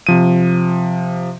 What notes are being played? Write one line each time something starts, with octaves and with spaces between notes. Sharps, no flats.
C3 F3 D#7